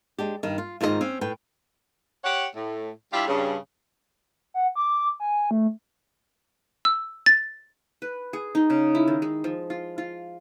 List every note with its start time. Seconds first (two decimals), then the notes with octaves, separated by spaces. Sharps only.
0.18 G#3 D4 G4
0.43 G2 D#3
0.58 F4
0.81 G#2 D#3 F4 G#4 D#5
1.01 C4 C#4
1.21 A2 B4 G5
2.24 G4 C#5 F#5
2.55 A2
3.13 G3 D4 E4 F4 G4
3.28 G2 C#3
4.54 F#5
4.76 D6
5.20 G#5
5.51 A3
6.85 E6
7.26 A6
8.02 B4
8.33 G#4
8.55 D#4
8.70 C#3
8.95 E4
9.08 D#3
9.22 G#3
9.44 F3
9.70 F4
9.98 F4